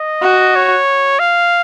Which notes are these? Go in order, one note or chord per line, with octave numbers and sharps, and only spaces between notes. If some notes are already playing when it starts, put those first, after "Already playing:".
Already playing: D#5
F#4
C#5
F5